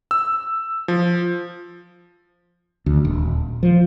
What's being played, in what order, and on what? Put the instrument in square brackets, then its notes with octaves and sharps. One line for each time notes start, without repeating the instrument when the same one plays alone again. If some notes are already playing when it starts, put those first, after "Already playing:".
[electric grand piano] E6
F3
[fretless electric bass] D2
D#1
F3